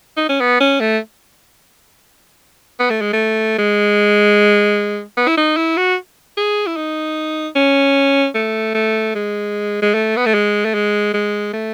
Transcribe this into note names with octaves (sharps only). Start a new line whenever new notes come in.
D#4
C#4
B3
C#4
A3
B3
A3
G#3
A3
G#3
B3
E4
D#4
E4
F#4
G#4
E4
D#4
C#4
A3
A3
G#3
G#3
A3
B3
A3
G#3
A3
G#3
G#3
A3